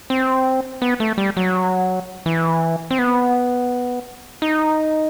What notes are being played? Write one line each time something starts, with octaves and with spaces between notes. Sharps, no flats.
C4
B3
A3
G3
F#3
E3
C4
B3
D#4